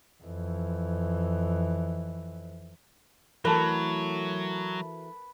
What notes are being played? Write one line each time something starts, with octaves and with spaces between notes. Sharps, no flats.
F2 E3
E3 F#3 A3 F#4 A#4 B4 A5